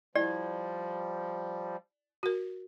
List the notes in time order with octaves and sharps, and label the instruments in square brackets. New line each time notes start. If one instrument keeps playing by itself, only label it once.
[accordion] F3 G3 [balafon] E4 [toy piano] D5
[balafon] F#4 A#4